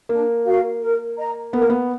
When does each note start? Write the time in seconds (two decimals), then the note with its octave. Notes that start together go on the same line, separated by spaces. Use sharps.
0.09 A#3 D4
0.46 F#4 A#4 F5
0.81 A#4
1.17 D#5 A#5
1.53 B3 A#4
1.62 A#3
1.70 B3